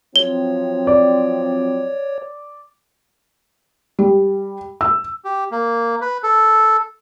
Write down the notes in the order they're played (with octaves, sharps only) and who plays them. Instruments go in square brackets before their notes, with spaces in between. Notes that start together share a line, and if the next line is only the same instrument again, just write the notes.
[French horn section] F3 F#3 C4 [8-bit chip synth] C#5 [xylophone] G7
[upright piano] D5
[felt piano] G3
E6
[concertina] G4
A#3
B4
A4